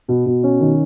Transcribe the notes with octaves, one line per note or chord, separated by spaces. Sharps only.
B2
B2
C#4
D#3